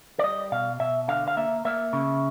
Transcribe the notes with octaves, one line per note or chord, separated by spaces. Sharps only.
D5
G3 D#5
B2 F5
B2 E5
D3 F5
F5
A#3 E5
A#3 E5
C#3